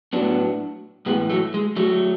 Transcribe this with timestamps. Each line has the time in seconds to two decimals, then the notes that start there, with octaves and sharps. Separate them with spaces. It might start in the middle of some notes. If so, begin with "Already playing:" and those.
0.13 A2 F#3 B3 D4
1.06 A2 E3 G#3 B3
1.30 F#3 A3
1.54 G#3
1.76 F#3 A3